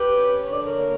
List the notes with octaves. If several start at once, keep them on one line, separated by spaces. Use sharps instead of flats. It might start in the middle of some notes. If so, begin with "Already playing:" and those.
Already playing: G4 B4
C#4
D3 C#5
D5
A#4 C#5
A#3